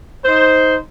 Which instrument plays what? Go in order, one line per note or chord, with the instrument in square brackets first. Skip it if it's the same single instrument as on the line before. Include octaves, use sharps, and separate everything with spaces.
[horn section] D#4 C5